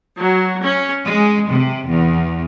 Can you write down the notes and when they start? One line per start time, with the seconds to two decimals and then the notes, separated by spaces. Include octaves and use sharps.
0.18 F#3
0.62 C#4
1.05 G#3
1.50 C3
1.88 E2